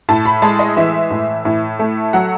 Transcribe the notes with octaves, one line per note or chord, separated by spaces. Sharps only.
A2 A5
B5
G#3 A5
D#5
E3 E5
A2
A2
A3
F#3 F#5